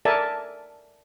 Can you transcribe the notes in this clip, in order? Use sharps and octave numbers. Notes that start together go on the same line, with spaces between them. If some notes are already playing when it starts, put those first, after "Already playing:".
A4 A#4 D5 E5 G#5 A5